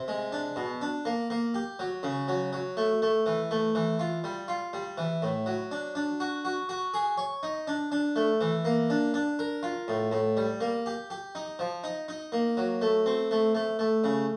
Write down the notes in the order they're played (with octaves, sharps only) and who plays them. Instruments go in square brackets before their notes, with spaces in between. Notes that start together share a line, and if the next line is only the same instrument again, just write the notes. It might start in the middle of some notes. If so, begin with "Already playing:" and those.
Already playing: [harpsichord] C3
G#3
D4
B2
D4
A#3
A#3
G4
F#3
C#3
F#3
F#3
A3
A3
E3
A3
E3
F4
G3
F4
G3
E3
A2
F#3
D4
D4
F#4
F#4
F#4
G#4
C#5
D#4
D4
D4
A3
E3
A#3
D4
D4
A#4
F4
A2
A2
G3
A#3
G4
G4
D#4
F3
D#4
D#4
A#3
F#3
A3
C4
A3
A3
A3
C#3